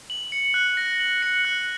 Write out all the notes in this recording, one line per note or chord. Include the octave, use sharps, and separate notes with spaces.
F#7
C#7
F#6
A#6
F#7
C#7
F#6